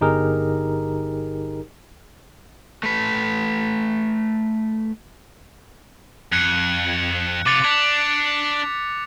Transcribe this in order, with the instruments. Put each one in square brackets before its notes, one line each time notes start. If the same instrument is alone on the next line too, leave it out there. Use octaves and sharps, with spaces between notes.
[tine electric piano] G1 D#4 G4 G#4 A#4
[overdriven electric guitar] A3 B4
[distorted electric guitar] F2 [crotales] F#6 G#6 C#7
[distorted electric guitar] C3 F4 [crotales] D6 A6 C#7
[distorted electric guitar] D4 [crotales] G#6 B6 F7